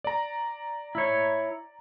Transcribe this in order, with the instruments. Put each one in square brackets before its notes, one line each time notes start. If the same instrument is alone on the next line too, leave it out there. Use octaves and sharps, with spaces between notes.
[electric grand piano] D5 A#5
[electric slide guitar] E4 C#5